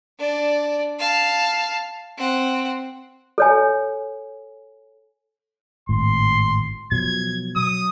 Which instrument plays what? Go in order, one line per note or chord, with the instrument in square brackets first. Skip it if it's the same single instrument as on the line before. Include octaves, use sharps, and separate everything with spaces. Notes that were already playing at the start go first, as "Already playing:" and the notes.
[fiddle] D4 D5
F5 A5
C4 F#5
[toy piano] A4 C#5 G#5
[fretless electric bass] G#1 A2 [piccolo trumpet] C6
[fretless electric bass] B2 F3 F#3 [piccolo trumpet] G#6
[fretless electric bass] F#3 [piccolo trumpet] D#6